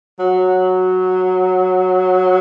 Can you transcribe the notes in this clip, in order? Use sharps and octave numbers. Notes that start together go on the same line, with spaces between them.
F#3